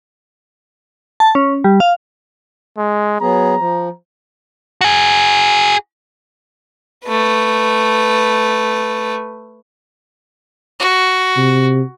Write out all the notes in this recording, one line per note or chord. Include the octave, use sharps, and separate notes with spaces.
A5
C#4
G3
F5
G#3
F#3 B3 G#4 A#5
F3
F#4 G#4
A3 B4
F#4
C3